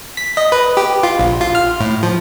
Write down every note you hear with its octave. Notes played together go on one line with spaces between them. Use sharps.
B6
D#5
B4
G4
F4
A#1
F4
F6
A2
F3